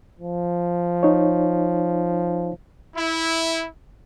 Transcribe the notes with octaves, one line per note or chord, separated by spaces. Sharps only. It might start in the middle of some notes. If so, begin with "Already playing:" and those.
F3
D#4 C#5
E4